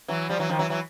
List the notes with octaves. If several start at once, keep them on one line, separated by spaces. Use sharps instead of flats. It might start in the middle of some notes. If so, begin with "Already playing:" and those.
E3 F#3
F3 G3
E3 F#3
D#3 F3
E3 F#3
E3 F#3